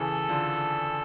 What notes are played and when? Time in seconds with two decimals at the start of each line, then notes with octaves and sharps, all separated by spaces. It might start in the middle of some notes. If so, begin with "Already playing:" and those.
Already playing: C#3 E3 A4
0.29 D3 F3